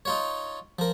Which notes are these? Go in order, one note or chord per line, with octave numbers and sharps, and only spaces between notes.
D#4 F4 C#5
F3 A#4